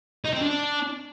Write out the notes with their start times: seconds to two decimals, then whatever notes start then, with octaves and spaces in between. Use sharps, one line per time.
0.25 D#4
0.34 C4
0.42 D4